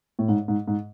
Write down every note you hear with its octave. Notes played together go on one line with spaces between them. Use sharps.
A2
G#2
G#2
G#2